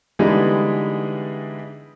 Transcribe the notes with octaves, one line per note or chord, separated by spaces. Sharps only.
D3 E3 G3 G#3 B3 D#4